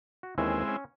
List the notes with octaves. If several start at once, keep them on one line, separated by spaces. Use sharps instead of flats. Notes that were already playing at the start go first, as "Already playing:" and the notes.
F#4
D#2 E3 G#3 C4 C#4 E4
C#4